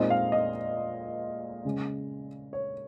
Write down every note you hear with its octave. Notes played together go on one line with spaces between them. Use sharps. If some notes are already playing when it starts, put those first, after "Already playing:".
Already playing: A#2 G#3 C4 D#4 D#5
F5
D#5
C#3 G#3 C#4
C#5